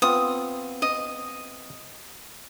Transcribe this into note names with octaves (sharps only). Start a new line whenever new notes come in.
B3 C4 F4 D#6
D#5